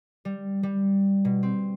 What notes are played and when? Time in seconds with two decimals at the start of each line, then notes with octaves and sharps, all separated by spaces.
0.25 G3
0.63 G3
1.25 B2
1.43 C4